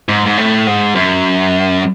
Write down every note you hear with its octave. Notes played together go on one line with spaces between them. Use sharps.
G#2
G#2
A2
G#2
F#2